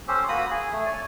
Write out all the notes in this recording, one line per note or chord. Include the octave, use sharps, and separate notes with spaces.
C#4 G4 A4 C5
A#3 F#4 B5 D#6
G#4
A3
C#5 D5 G#5